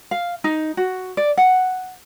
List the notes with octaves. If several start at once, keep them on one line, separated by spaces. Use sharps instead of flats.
F5
D#4
F#4
D5
F#5